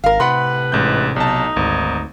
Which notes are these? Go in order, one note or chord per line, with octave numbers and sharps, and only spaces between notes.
G#1 A#4 F5
A2 C3 B4 F#5 B5 C6
A1 G#2 G6
B1 D#4 A5
G#1 D2